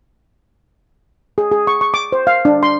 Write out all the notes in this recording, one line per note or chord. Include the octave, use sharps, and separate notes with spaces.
G#4
G#4
C#6
C#6
D6
C5
F5
D4
C6